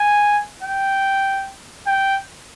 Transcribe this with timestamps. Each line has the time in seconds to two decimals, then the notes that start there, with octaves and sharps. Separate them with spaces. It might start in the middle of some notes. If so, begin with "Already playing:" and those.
Already playing: G#5
0.63 G5
1.87 G5